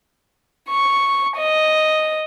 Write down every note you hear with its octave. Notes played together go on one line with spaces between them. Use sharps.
C#6
D#5